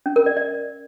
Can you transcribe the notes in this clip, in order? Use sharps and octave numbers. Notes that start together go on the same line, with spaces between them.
C#4
A#4
D5
D5